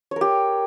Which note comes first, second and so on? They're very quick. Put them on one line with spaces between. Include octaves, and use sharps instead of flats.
C#5 A#4 G4